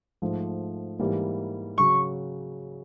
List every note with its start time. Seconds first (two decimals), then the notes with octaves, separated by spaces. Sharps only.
0.22 G#2 F3 A3
0.99 G#2 E3 G3 A#3
1.78 C#3 F#3 C#6